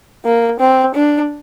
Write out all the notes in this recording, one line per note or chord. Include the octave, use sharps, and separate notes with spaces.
A#3
C4
D4